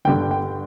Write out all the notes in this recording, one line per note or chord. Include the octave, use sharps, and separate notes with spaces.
G1 G2 D3 G5
G5